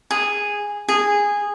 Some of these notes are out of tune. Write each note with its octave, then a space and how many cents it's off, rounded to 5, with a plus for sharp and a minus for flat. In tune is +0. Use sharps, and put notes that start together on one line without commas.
G#4 -10
G#4 -15